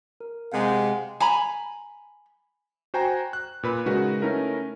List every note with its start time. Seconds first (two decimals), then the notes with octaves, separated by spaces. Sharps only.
0.20 A#4
0.52 C3 G#3 F5 F#5 G#5
1.20 G#5 A#5 B5
2.94 F#4 C5 G5 G#5 A#5
3.33 F#6
3.63 A#2 B4 B5
3.86 C#3 G#3 D#4 F#4 A#4 B4
4.22 A3 C#4 D#4 E4 A#4 B4